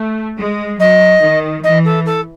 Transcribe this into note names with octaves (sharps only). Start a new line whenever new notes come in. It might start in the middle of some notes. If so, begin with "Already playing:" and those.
Already playing: A3
G#3
F#3 D#5
D#3
E3 D#5
A4
A4